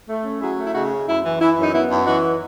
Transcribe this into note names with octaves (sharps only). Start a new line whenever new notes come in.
A3
C#4
F#3 E4 G#4
A3
E4
C#3 D#4 F#4
C#4
F#2 E4
E3
E3 E4
F#2
D#4
B3 E4
F#2
E3 D#4 F#4